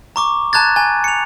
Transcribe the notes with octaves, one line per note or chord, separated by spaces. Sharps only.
A#5 C#6 D6
A5 A#5 F#6 G#6 A6
G#5
C#7 F7